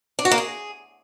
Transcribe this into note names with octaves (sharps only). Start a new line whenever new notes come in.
D4
F#4
A#3
G#4